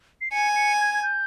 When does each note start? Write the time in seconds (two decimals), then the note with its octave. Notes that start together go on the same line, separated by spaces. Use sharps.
0.21 C7
0.31 G#5 C#7
0.56 C#7
0.80 G#6
0.94 G#6
1.03 G6